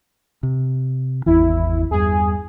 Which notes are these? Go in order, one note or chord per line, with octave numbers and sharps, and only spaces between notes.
C3
G#1 E2 E3 E4
E2 G2 G#4